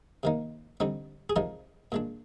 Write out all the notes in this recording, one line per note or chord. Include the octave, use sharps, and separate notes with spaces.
C3 D#3 A#3 D#4
D3 G3 C4 D#4
G#4
C3 F3 G#3 D#4 A#4
A#2 G#3 D4